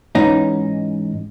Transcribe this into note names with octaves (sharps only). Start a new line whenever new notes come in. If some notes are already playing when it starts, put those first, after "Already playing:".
G#2 E3 C#4 D#4